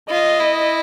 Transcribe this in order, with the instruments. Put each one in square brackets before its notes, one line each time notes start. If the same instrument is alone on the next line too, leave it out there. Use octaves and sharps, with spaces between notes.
[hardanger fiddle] F4 [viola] D#5
[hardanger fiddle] E4